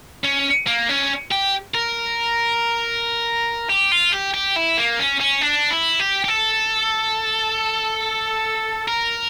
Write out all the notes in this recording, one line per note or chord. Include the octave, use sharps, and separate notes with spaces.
C#4
A#3
C#4
G4
A#4
G4
F4
G4
G4
E4
A#3
C#4
C#4
D4
E4
G4
G4
A4
A#4